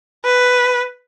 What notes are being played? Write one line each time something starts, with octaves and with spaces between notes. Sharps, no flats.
B4